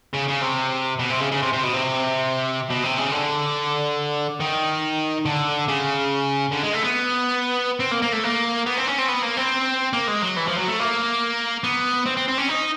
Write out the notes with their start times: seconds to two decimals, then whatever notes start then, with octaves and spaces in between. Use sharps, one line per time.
0.14 C#3
0.29 C#3
0.42 C3
0.99 B2
1.10 C3
1.20 C#3
1.31 C#3
1.42 C3
1.53 C3
1.63 B2
1.73 C3
2.70 B2
2.83 C3
2.98 C#3
3.11 D3
4.40 D#3
5.25 D3
5.68 C#3
6.52 D3
6.63 G#3
6.73 A3
6.84 B3
7.80 C4
7.91 A#3
8.02 A#3
8.13 A3
8.24 A#3
8.66 B3
8.77 C4
8.87 C#4
8.98 C4
9.08 B3
9.22 A#3
9.37 C4
9.93 A#3
10.08 G#3
10.22 F#3
10.36 E3
10.47 F3
10.58 F#3
10.67 A3
10.79 A#3
11.64 B3
12.06 C4
12.17 C4
12.28 C4
12.38 C#4
12.49 D#4